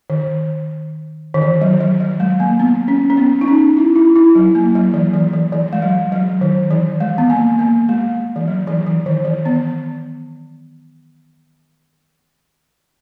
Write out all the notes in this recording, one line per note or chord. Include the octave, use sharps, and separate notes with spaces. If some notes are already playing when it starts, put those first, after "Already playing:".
D#3
D#3
E3
F#3
F#3
F#3
G#3
A#3
B3
C#4
C#4
B3
D#4
C#4
E4
E4
E4
F#3
A#3
F#3
E3
E3
E3
E3
G#3
F#3
F#3
D#3
E3
G#3
B3
A#3
A#3
G#3
E3
F#3
E3
E3
D#3
E3
B3